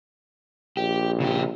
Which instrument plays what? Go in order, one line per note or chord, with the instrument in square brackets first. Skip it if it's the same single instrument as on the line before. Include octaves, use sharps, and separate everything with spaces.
[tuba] A#1 [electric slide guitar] G4
[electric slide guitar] C#3 G4